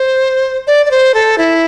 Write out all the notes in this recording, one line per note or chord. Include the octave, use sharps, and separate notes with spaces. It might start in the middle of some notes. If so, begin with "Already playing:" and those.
Already playing: C5
D5
D5
C5
A4
E4